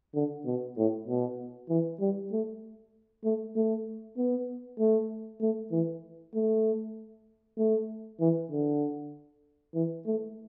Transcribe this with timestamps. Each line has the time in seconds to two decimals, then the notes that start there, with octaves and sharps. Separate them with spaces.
0.15 D3
0.45 B2
0.77 A2
1.07 B2
1.69 E3
2.00 G3
2.32 A3
3.24 A3
3.56 A3
4.17 B3
4.79 A3
5.41 A3
5.71 E3
6.34 A3
7.57 A3
8.20 E3
8.51 D3
9.74 E3
10.06 A3